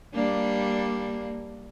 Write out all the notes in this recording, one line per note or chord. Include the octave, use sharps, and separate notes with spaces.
G3 A#3 D4